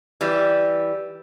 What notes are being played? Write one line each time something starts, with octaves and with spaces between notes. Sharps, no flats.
E3 G3